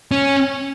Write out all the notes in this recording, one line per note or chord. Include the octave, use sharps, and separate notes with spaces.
C#4